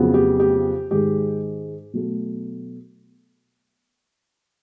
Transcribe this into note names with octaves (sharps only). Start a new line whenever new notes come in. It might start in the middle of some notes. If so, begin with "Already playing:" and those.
Already playing: F2 C#3 F#3 B3
G4
G4
G#2 D#3 G#3 G4
B2 F#3 A3